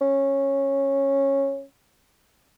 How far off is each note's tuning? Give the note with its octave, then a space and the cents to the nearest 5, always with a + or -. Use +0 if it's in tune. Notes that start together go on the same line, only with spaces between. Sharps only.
C#4 -10